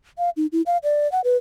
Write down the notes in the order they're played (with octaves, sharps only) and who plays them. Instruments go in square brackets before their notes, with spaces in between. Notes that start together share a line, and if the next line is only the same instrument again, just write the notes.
[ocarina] F5
D#4
E4
F5
D5
F#5
B4